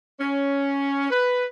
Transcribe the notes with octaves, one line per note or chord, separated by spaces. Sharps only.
C#4
B4